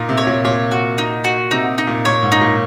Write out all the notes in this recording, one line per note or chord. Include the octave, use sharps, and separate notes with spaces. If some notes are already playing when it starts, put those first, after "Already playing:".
Already playing: A#2 D#4
C3
C#5
A#2
A#2 C#5
F#4
D#4
F#4
C3 D#4
D#4
A#2
A#2 C#5
G#2
D#4
A#2